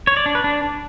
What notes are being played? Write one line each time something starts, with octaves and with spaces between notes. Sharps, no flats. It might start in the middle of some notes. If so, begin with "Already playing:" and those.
C#5
D5
D4
B4
D4